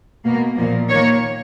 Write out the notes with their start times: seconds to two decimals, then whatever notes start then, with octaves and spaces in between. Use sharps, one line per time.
0.23 B2 A#3
0.56 A#2 F3 A#3
0.89 D#3 A#3 C#5